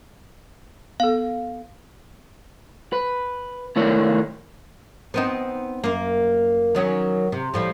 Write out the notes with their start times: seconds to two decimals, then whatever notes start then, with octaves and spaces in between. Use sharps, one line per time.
1.00 B3 A4 F5
2.92 B4
3.76 D#3 A3 E4 A#4 C#5 D5
5.14 B3 C4 D#4
5.84 F#2 A#3
6.75 D#3 F#3 C#4
7.32 C3
7.54 A2 F3 G3